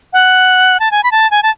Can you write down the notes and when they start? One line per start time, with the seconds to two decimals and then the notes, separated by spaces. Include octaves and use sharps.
0.13 F#5
0.80 A5
0.91 G#5
1.03 B5
1.12 A5
1.31 G#5
1.43 A5